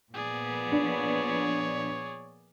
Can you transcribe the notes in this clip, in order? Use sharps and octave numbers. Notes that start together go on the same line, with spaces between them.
A#2 F3 B3 G#4 D5
D4 C#5